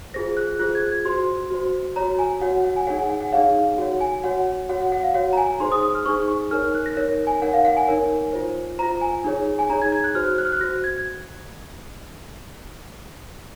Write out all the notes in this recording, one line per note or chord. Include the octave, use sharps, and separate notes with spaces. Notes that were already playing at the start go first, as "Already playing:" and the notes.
F4 G#4 C5 A#6
F#6
F4 G#4 C5 F#6
G#6
G#6
F#4 C5 C6
F#4 C5
F#4 C#5 A#5
G#5
F#4 C#5 F#5
F#5
G#5
D#4 G#4 C#5 F#5
G#5
F#5
F#5
D#4 G#4 C#5 F5
F#4 C#5 F#5
G#5
F#4 C#5 F#5
F#4 C#5 F#5
F#5
F#5
F5
F#4 C#5 F#5
A#5
G#5
D#4 G#4 C5 C6
D#6
D#6
F6
D#4 G#4 C5 C#6
C#6
D#4 A#4 C#5 F6
F#6
A#6
D#4 A#4 C#5 A#6
G#5
D#4 A#4 C#5 F#5
F5
F#5
G#5
D#4 A#4 C#5
F4 C5
F4 C5 A#5
G#5
D#4 G#4 C#5
G#5
D#4 G#4 C#5 A#5
G#6
G#6
F#6
F#4 C5 F6
F#6
F6
F#6
F#4 C5 A#6
G#6